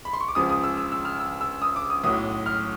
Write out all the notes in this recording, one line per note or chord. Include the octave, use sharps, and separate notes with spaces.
B5
C6
C#6
D6
C#2 C#3 F3 D#6
D#6
E6
E6
E6
F6
E6
E6
D#6
D6
D#6
B1 A2 F#3 D#6
F6